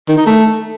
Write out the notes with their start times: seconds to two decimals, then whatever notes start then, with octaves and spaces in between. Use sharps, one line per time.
0.08 D#3
0.17 D#4
0.26 A3